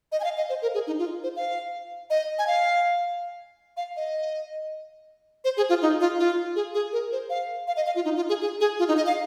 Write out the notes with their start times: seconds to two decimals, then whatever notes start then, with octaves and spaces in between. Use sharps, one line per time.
0.12 D#5
0.20 G#5
0.24 F5
0.37 D#5
0.49 C5
0.62 A#4
0.74 G#4
0.87 D#4
0.98 F4
1.24 C5
1.36 F5
2.10 D#5
2.39 G#5
2.47 F5
3.77 F5
3.96 D#5
5.44 C5
5.57 G#4
5.69 F4
5.82 D#4
6.00 F4
6.20 F4
6.56 G#4
6.74 G#4
6.93 A#4
7.12 C5
7.30 F5
7.67 F5
7.76 D#5
7.86 F5
7.96 F4
8.05 D#4
8.16 F4
8.29 G#4
8.42 G#4
8.61 G#4
8.79 F4
8.88 D#4
8.97 D#5
9.06 F5